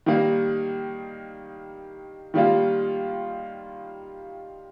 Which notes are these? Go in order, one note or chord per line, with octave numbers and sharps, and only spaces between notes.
D#3 G3 A#3
D#3 G3 A#3 F4